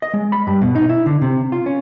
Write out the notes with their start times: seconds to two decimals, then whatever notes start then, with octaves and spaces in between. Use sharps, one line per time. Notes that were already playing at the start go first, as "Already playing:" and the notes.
0.02 D#5
0.14 G#3
0.32 B5
0.47 G2
0.62 B2
0.75 D#4
0.89 E4
1.06 D3
1.22 C3
1.52 F4
1.66 C#4